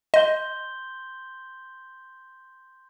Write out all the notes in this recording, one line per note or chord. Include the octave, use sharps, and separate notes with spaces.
D#5 C6 G6 G7